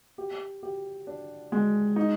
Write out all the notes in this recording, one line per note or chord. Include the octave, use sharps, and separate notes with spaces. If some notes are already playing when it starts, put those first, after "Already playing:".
G4
G4
D4
G#3
D#4